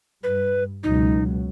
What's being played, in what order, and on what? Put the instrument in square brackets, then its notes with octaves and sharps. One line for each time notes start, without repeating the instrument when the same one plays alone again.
[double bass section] G2 [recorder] B4
[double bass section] C#2 B2 F#3 [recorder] D#4